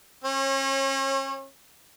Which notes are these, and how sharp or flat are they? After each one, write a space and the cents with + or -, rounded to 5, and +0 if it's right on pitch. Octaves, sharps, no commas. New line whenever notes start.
C#4 -40 C#5 -30